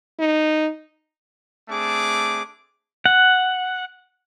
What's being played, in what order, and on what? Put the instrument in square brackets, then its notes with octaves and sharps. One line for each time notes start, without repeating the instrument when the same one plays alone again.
[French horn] D#4
[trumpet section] A3 C4 D4 G#4 D6
[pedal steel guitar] F#5